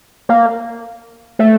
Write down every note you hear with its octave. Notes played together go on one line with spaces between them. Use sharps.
A#3
A3